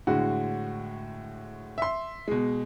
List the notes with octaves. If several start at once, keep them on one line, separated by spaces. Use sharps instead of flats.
A2 D3 G#3 F#4
E5 C6
B2 G#3